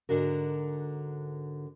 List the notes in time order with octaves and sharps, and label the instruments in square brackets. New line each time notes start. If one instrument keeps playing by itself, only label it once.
[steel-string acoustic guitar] G#2 D3 D4 F#4 A#4